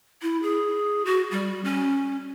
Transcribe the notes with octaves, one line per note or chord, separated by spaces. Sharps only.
E4
G#4
F#4
G3
C#4